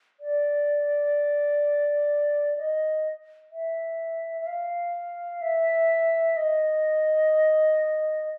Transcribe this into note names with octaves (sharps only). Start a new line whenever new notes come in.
D5
D#5
E5
E5
F5
E5
D#5